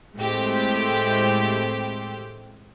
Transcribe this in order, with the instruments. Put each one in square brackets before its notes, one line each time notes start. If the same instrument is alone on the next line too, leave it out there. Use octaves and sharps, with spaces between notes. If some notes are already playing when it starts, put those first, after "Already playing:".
[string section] A2 G#3 A3 C4 G4